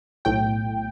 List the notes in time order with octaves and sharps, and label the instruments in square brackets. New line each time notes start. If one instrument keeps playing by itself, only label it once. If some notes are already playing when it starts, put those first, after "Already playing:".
[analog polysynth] B1 A2 G5